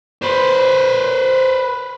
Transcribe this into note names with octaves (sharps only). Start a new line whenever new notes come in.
B4 C5